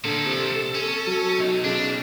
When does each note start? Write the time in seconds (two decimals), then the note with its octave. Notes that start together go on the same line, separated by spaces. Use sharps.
0.05 A#2 D3 F3 A4
0.26 C3
0.75 C#4
1.07 F#3
1.38 B2 D#4
1.65 C#3 D4